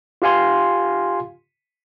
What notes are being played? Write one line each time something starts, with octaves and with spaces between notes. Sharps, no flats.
F4 G4 F5 G#5 C6